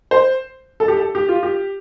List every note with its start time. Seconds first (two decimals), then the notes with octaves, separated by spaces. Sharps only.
0.11 C5
0.80 A4
0.88 G4
0.97 A4
1.15 G4
1.29 F4
1.43 G4